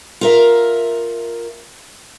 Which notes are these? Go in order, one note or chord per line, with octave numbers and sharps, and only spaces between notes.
F4 A#4 E5